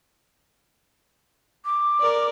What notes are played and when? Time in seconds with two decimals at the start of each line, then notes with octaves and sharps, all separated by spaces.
1.64 D6
2.00 A#4 D5